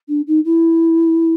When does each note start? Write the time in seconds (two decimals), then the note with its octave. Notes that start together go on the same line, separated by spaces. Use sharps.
0.08 D4
0.27 D#4
0.45 E4